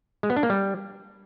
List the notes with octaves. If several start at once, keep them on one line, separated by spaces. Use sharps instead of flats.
G#3
B3
D4
A#3
G3